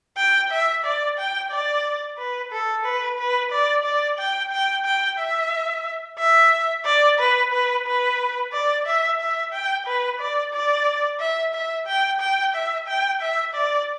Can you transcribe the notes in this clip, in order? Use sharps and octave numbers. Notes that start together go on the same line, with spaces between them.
G5
E5
D5
G5
D5
B4
A4
B4
B4
D5
D5
G5
G5
G5
E5
E5
D5
B4
B4
B4
D5
E5
E5
G5
B4
D5
D5
E5
E5
G5
G5
E5
G5
E5
D5